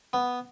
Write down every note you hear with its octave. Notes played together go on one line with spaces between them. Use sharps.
B3